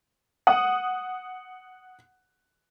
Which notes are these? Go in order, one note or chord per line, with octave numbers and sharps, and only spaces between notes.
F#5 D#6